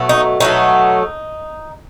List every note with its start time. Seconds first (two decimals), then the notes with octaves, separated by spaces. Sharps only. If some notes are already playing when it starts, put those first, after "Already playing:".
Already playing: B2 F#3 A3
0.09 D#4
0.40 B2 F#3 A3 D#4